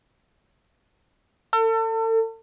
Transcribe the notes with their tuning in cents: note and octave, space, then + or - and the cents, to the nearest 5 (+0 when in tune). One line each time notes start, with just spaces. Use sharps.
A4 +40